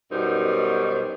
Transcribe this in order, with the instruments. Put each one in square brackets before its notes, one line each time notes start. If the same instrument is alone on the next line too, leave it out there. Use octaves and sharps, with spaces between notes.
[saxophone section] F#2 B2 G3 B3 D#4 C5